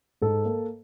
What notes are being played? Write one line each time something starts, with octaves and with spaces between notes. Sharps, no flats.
G#2 A4
A#3